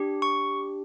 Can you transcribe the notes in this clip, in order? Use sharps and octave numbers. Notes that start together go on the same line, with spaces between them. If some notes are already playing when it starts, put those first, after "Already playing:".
Already playing: D4 G4
C#6